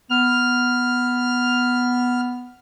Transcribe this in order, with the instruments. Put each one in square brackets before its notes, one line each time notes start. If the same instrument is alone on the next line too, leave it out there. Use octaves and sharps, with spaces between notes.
[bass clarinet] B3 [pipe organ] F6